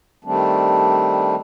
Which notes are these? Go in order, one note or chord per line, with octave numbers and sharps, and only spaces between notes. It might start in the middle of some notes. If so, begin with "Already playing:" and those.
D#3 G3 A3 C4 D4